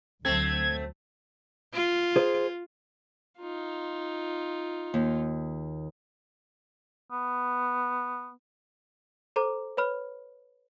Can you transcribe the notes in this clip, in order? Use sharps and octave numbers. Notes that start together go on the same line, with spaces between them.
D2 F#3 A3 C4 G#6
F4
G#4 C5
D#4 F4
D#2
B3
A4 C5 A#5 D6
B4 C#5 B5 F6